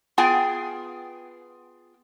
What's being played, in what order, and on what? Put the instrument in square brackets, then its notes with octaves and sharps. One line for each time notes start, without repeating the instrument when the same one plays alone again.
[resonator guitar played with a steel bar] B3 F4 G#4 G5 G#5